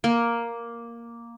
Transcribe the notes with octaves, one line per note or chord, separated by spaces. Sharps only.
A#3